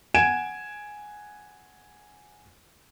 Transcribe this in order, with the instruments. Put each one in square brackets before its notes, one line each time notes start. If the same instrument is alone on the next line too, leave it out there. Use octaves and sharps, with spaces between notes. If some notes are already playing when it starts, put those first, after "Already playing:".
[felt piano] F#5 G#5 G#6 D7 E7